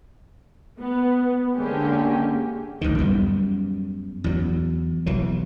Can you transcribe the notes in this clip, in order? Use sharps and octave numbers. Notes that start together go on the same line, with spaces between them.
B3
D3 G#3 A#3 C#4 G4
A1 D2 G#2 D#3
F#2 G3 B3
E2 F#3
B1 E3 F#3